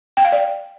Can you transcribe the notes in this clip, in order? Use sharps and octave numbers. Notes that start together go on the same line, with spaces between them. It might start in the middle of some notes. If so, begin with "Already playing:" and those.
G5
F5
D5